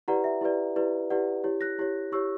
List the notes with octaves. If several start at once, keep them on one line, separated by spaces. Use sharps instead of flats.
E4 G4 B4 D5 F#5 A#5
E5
E4 G4 B4 D5
E4 G4 B4 D5
E4 G4 B4 D5 F#5
E4 G4 C#5
F#6 A#6
E4 G4 C#5
E4 G4 C#5 C#6 E6